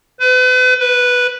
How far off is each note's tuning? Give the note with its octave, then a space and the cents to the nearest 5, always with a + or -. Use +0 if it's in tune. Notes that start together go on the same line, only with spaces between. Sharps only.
B4 +40
B4 -5